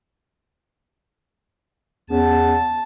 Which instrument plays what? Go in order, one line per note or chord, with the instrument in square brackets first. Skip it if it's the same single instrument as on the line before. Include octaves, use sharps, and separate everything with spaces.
[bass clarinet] E2 [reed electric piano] B3 C#4 [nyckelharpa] A5